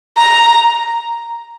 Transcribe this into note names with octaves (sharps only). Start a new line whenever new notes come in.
A#5